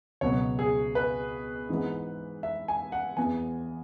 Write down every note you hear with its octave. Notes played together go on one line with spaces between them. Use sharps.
C#2 B2 F#3 B3 C#5
G#4
B4
G#2 E3 G#3 B3
E5
G#5
F#5
E2 E3 B3 G#5